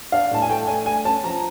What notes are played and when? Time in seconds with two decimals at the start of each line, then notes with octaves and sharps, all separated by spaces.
0.12 D4 F5
0.31 A2 A5
0.42 G#5
0.50 A3 G5
0.67 D4 G#5
0.86 A3 G#5
1.05 C#4 A5
1.24 F3 A#5